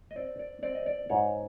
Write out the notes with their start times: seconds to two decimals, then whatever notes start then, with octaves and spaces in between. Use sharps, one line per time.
0.11 D#5
0.16 C4 D5
0.39 D5
0.63 C4 D5
0.75 D#5
0.86 D5
1.10 G#2 C#5